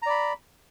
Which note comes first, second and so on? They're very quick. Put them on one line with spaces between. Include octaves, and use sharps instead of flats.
A#5 D5 B5